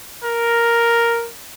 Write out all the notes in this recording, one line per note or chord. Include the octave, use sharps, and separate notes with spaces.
A#4